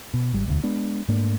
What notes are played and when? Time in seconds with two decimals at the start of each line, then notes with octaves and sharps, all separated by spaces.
0.14 B2
0.33 G#1 G3
0.46 E1 D2
0.64 G#3 B3 D4
1.09 G#2 A3 A#3 D4